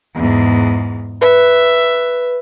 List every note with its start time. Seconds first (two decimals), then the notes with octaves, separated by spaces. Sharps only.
0.15 E2 G#2
1.22 B4 E5